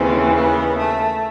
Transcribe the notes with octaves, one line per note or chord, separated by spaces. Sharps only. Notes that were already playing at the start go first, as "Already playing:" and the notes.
Already playing: D#2 C#3 E3 C4
B3
A3